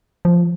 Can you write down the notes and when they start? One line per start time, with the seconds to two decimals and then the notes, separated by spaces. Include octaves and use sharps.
0.25 F3